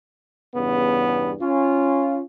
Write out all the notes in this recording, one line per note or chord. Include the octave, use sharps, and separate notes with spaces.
E2 G2 C#3 B3
C#4 F4